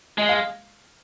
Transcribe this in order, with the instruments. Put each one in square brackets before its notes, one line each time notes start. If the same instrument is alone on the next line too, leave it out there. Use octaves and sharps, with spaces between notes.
[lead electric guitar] G#3 [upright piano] D#5
[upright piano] F5